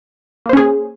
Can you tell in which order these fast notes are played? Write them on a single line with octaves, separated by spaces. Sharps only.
A#3 C5 C#4 G#4